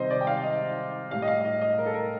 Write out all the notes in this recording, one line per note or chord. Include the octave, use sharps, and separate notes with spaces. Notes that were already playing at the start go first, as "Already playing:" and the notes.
Already playing: C3 D#3 G3 C5 D#5
D5
G5
F5
D#5
A2 G3 F5
D#5
F5
D#5
D#5
A#4
A4
A#4